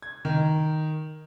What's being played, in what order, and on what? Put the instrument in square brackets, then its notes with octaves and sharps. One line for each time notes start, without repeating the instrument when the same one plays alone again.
[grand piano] G#6
D#3